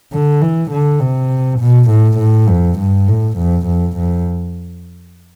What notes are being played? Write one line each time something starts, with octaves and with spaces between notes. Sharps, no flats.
D3
E3
D3
C3
B2
A2
A2
F2
G2
A2
F2
F2
F2